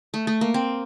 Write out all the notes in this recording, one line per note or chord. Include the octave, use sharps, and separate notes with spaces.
A3
A3
A#3
C4